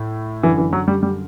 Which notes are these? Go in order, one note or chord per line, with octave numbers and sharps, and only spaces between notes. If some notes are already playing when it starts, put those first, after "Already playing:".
Already playing: A2
F#2 D3 E3
E3
F#3
G3
G3